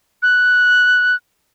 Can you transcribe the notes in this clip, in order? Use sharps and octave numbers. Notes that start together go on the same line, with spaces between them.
F#6